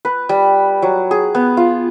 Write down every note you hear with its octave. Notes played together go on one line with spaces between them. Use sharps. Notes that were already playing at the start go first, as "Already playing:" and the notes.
B4
G3
F#3
G#4
B3
F4